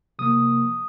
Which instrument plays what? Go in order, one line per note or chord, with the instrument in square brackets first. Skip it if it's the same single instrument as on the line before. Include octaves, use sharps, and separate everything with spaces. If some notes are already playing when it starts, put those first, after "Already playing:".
[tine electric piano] C3 F3 A#3 D#6